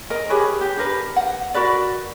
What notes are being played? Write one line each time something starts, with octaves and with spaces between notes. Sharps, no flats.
A#4 D#5
G4 G#4 B4 C#5
G4
D4 G4 A#4 B4
F#5
F#4 A#4 B4 D5